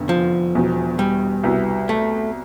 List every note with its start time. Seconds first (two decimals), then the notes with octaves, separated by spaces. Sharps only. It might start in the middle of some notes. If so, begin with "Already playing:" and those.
Already playing: F1 E2 D3
0.09 F3
0.54 E1 E2 B2
0.99 G3
1.44 C2 B2 B3 E4
1.89 A3